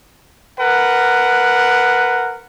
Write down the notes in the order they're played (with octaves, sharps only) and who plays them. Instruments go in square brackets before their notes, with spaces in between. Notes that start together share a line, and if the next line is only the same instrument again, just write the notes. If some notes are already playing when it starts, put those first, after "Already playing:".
[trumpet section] A#4 B4 F#5